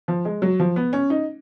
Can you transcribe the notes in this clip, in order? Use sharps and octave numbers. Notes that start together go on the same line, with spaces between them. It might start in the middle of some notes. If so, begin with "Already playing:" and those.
F3
G#3
F#3
F3
B3
C#4
D#4